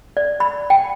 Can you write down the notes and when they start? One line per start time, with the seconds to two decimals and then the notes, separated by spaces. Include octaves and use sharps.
0.17 D5
0.40 B5
0.70 G5